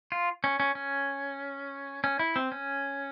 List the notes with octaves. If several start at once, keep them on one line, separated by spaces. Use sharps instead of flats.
F4
C#4
C#4
C#4
C#4
E4
C4
C#4